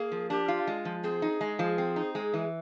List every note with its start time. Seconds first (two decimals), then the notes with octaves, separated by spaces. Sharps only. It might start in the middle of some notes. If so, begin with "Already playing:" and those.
Already playing: A#3 G#4
0.12 F3
0.30 D4 G4
0.48 F4
0.67 G#3
0.85 F3
1.04 C4 G#4
1.22 D#4
1.41 G#3
1.59 F3
1.78 C4
1.96 D#4
2.14 G#3 G#4
2.34 E3